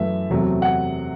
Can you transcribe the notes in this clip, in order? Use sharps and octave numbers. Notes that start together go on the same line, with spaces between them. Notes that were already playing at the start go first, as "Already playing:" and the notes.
Already playing: F#2 E3 A3 E5
E2 C3 F#3 A3
F#5